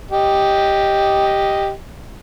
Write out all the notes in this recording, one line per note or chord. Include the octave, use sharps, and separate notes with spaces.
G4 D#5